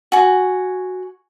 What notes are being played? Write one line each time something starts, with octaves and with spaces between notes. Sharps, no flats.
F#4 G#5